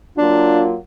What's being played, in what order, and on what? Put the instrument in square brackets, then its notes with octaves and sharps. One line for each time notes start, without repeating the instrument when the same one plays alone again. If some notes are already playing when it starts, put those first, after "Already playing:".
[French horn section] F#3 A#3 F4 [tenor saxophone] D4